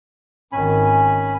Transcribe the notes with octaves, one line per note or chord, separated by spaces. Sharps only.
G#1 D#3 C#4 G#5 B5